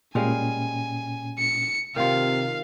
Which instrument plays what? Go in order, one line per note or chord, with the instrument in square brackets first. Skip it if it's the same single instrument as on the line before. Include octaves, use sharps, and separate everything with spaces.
[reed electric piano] A#2 C#4 [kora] G3 G#3 F5 [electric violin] G#5
[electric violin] C#7
[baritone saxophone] C3 [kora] D#3 F4 [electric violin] F5